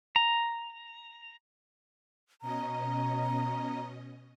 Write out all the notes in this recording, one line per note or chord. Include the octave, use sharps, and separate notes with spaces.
A#5
B2 C#4 D#5 A#5